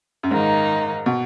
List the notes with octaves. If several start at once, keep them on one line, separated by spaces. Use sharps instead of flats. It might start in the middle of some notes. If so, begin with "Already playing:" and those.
F#2
G#2 D#3 A#3 D#4
B2